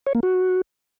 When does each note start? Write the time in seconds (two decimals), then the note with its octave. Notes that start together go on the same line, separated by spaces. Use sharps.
0.07 C#5
0.15 A#3
0.23 F#4